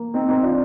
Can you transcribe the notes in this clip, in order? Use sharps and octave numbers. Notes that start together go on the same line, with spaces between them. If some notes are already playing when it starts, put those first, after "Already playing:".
Already playing: A#3
C4 D#4
C4 D#4
D4 F4